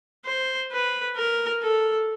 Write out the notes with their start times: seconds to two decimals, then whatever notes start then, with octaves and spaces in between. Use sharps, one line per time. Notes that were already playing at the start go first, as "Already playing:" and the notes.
0.26 C5
0.72 B4
1.16 A#4
1.62 A4